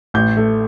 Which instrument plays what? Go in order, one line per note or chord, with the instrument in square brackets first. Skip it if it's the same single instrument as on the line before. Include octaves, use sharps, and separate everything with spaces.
[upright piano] A1 G6
A3